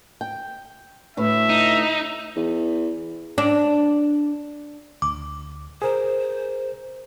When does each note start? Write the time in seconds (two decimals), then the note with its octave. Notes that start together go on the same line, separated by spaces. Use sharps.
0.21 G5
1.17 D2 A2 B4 E5
1.50 D#4
2.36 E2
3.38 D4
5.02 D2 D6
5.82 G#4 A#4 C5